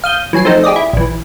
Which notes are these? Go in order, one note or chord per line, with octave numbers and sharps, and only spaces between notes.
F5 D#6 G6
E3 F#3 G#5 C7
F3 A3 C4 D#4
G4 G#4 D5 D#5
E4
A#1 E3